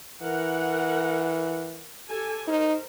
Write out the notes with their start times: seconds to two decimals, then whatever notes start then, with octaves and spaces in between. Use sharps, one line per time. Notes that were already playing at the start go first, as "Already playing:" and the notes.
0.22 E3 A#4 F#5
2.08 G4 A4 G#5
2.48 D#4 A#4 C5